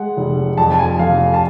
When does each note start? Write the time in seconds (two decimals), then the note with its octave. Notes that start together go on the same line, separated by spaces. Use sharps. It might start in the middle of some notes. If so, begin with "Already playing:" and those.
Already playing: G#3 F#5
0.17 F1
0.58 F2 A5
0.72 A5
0.79 G#5
0.99 F1 F5
1.34 A5